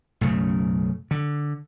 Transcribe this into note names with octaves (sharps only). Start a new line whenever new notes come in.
B1 F#2 C#3 A3
D3